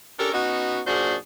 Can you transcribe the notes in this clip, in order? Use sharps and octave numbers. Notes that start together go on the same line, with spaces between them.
C#4 D4 G4 A4 A#4
B3 C#4 D#4 F#4
F#2 A#2 D4 F#4 G#4 C5